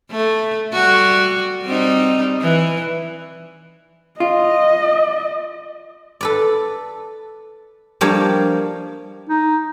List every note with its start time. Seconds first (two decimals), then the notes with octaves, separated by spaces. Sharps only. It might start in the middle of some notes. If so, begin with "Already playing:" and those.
0.11 A3
0.73 G3 F#4
1.64 G3 C4 D#4
2.42 E3
4.20 F4 D#5
6.21 A4 B4 D5
8.01 F3 G3 A#3 D4 C#5
9.29 D#4